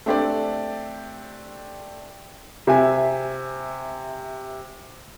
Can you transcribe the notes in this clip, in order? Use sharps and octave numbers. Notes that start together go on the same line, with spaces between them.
A3 C4 D4 G4 A4 D5
C3 E5 G#5